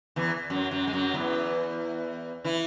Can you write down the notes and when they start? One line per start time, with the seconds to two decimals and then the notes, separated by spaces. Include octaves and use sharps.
0.16 E2 E3
0.50 F#2 F#3
0.71 F#2 F#3
0.87 G#3
0.93 F#2 F#3
1.14 E2 E3
2.44 E3 E4